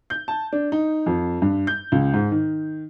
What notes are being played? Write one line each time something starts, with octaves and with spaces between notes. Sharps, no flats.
G6
A5
D4
D#4
F2
G2
G6
C#2
G#2
D#3